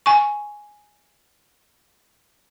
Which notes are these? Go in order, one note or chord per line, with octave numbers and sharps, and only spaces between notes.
G#5 C#6